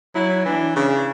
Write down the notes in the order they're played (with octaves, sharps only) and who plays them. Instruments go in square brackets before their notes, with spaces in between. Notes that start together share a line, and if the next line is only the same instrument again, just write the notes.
[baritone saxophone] F#3 [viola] E4
[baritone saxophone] E3 [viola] D4
[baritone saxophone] C#3 [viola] D4